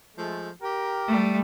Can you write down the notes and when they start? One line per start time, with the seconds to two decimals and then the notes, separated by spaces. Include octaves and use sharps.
0.17 F3 G#3 A3
0.62 G4 A#4
1.08 G3 A3